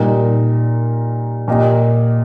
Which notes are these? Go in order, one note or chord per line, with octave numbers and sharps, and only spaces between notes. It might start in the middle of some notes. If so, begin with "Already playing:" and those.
Already playing: A#2 G3 D#4 A#4
A#2 A#3 G4 D#5